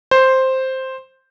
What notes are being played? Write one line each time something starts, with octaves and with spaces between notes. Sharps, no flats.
C5